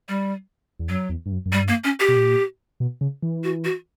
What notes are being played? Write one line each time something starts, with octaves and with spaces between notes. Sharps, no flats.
G3
E2
F#2 F#3
E2
G2
F#2
F#2
G2 G3
A#3
C#4
G4
B2
A#2
B2
C#3
E3
F#4
F#4